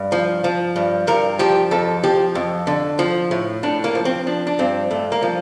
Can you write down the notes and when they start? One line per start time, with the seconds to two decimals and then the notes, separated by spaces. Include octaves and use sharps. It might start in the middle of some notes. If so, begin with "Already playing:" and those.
Already playing: G2
0.12 F3
0.44 F3
0.76 G2
1.07 G2 A#4
1.39 F3 G4
1.71 F2 A4
2.04 F3 G4
2.35 F2
2.67 D3
2.99 F3
3.31 A2
3.63 A2 D4
3.84 A#3
3.95 F3
4.05 C4
4.27 F3 D4
4.47 D4
4.59 G2 C4
4.91 G2 A3
5.12 A#3
5.22 F3